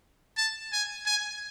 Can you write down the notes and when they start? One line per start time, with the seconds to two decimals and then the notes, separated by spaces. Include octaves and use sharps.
0.37 A5
0.72 G#5
1.06 G#5